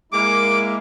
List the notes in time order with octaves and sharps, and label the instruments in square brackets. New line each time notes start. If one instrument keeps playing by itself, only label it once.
[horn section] G#3 A#3 E4 [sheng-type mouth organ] D6